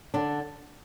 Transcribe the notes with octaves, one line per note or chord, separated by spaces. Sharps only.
D3 D4